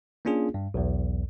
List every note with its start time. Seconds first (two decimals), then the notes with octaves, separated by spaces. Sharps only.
0.25 A#3 C#4 D4 F4 G#4
0.54 G2
0.74 B1 E2